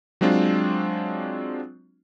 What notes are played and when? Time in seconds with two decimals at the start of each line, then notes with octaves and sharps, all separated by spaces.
0.21 F#3 G#3 C4 D4 F4